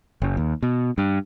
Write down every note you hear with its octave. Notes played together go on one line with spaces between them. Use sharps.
F#1
D#2
B2
G2